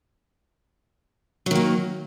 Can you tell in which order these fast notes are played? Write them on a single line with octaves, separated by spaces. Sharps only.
F#3 D#3 A#3